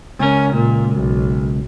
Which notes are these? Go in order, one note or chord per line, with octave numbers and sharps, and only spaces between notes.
C#2 C#4 A#4
A#2
B1